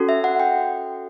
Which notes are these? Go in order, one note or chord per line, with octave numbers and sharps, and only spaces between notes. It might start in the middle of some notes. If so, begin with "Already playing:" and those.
Already playing: C#4 F#4 A4
E5
F#5
G5